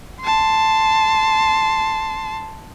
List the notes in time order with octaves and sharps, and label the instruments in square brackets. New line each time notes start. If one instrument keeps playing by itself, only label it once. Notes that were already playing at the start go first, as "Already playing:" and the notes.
[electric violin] A5 C6